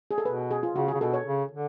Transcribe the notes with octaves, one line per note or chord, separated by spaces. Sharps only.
G#4
A4
B2 B4
G#4
F4
C#3 F#4
G#4
C#3
B2 A4
C#5
C#3
D3